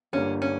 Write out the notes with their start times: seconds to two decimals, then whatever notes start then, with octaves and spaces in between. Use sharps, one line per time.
0.13 G1 G2 D3 G3 A#3 C#4
0.42 C#4